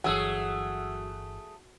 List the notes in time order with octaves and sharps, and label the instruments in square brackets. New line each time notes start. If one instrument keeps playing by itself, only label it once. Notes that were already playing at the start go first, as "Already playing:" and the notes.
[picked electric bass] G1 E3 [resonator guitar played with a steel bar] F#3 [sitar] A3 G#4 [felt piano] F#5 E6